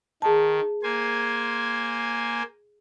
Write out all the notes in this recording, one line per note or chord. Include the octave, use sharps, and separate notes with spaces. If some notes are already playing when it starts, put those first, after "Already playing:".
D#3 G#4 A5
A#3 C5 G#5